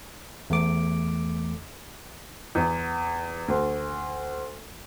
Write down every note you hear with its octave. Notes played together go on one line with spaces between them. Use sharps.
E2 A3 D6
E2
D2